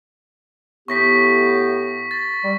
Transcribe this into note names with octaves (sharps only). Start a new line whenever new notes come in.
A2 B3 G4 C#6 A#6 B6
A6
G3